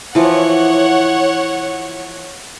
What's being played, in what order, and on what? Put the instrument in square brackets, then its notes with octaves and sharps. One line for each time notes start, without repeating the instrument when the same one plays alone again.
[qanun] E3 F3 [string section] C#5 F#5